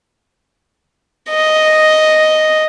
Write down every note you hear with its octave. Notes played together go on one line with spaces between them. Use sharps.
D#5